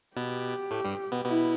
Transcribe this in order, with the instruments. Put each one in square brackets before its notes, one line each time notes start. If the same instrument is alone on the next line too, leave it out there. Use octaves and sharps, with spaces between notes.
[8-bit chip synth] B2 B3 [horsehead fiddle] G4
[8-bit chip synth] A2 A3
G2 G3
B2 B3
[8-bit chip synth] B2 B3 [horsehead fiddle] E4